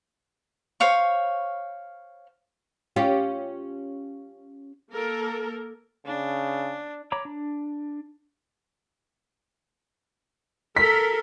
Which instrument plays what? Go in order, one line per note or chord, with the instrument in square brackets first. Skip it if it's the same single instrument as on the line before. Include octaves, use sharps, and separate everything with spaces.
[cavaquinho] C5 C#5 F5 C#6
[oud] C#4 F4 G4
[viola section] A#3 A4 A#4
[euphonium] C#3 [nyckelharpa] D4
[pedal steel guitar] C#5 A#5 B5 D6
D4
[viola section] A4 A#4 [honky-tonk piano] B6